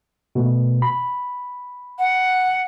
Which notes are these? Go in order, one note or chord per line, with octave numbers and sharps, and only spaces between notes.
B2 A3
B5
F#5